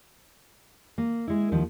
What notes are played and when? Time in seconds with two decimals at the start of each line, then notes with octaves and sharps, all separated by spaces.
0.98 A#3
1.27 G#3 E4
1.52 D#2 D#3 F3